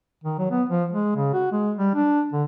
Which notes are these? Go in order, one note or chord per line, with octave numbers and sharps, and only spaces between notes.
D#3
F#3
B3
F3
G#3
C#3
F#4
G#3
G3
D4
D3